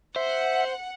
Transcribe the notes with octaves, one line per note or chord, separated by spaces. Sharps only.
C5 E5 F#5